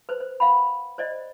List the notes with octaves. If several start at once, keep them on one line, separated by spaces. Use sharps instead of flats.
B4 C5
C5
F5 F#5 B5
C5 D5 D#5